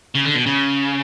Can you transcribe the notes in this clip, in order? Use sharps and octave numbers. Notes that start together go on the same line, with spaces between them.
C#3
D3
B2
C#3